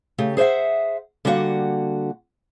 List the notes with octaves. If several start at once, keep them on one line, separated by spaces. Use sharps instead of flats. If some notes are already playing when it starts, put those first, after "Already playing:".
C#3 A3 G4
G#4 C5 C#5 E5 F#5
D3 G3 A#3 F#4 F#5